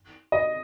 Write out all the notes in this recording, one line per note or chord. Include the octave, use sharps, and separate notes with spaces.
D#5